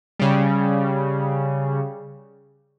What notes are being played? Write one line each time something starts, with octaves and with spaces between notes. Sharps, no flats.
C#3 G3